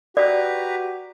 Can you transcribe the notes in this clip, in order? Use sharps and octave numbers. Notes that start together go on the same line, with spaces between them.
F#4 G4 B4 D5 A#5